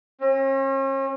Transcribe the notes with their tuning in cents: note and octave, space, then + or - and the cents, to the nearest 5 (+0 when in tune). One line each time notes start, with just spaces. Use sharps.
C#4 -45